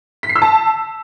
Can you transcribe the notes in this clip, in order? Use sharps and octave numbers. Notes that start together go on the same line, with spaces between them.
B6
C7
E6
A5